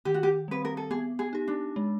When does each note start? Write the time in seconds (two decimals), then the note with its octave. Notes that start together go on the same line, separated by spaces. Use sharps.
0.05 D#3 G4
0.14 F#4
0.23 G4
0.48 G3 C4 B4
0.65 A#4
0.77 A4
0.91 B3 G#4
1.19 G#4
1.33 D#4 G4
1.48 D4
1.76 G#3